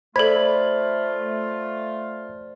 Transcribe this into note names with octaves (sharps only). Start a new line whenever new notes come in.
A3 F4 A4 C5 D5 B5 G#6